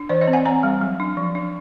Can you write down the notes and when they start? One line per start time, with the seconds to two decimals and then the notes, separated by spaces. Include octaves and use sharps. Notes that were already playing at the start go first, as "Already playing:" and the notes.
Already playing: D4
0.09 E3 C5 D5
0.21 C#5 D#5
0.28 C4
0.33 F#5 G#5
0.45 C4 G#5 A#5
0.63 G3
0.81 F#3
1.00 D4
1.17 F3
1.35 D4